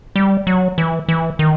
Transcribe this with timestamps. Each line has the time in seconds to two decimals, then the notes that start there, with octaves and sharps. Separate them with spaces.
0.16 G3
0.47 F#3
0.78 E3
1.09 E3
1.39 D#3